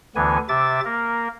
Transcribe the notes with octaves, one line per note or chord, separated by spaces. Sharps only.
D2 D3 E3 B3 G#5
C3 E5 D6 A6
A#3 A#4